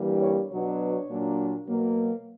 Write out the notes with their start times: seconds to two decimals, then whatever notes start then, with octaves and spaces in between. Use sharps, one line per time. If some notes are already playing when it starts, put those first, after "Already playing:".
Already playing: G2 E3 G3 A#3
0.22 C#5
0.51 B2 F#3 B3 D4 C#5
1.09 A#2 F#3 A#3 D4
1.66 B2 F#3 A#3